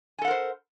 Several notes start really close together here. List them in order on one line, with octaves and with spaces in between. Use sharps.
G#5 A4 F#5 A#4 C5